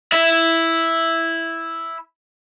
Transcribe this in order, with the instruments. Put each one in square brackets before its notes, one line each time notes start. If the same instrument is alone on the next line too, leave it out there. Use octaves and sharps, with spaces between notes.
[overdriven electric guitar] E4 E5